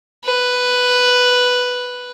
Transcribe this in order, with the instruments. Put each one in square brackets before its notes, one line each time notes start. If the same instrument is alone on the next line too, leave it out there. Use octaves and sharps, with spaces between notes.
[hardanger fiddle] B4